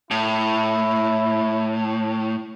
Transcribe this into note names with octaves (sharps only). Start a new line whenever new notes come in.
A2 E4